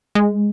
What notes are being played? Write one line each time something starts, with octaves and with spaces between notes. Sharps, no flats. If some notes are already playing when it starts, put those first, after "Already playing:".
G#3